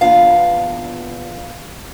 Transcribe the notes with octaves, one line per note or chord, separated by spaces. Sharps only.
E2 A#2 B3 D4 F4 F5